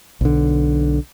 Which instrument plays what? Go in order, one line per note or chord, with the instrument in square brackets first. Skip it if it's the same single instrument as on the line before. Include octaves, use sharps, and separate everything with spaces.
[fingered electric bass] B1 D3